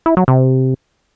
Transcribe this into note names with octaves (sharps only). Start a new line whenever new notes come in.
E4
F#3
C3